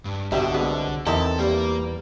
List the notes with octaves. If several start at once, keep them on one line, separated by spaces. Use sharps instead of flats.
G2
C2 B2 D3 F#3 G4 E5
F#3 G#3 B3
E2 C4 D#4 E4 A4 A#4
G3 A#3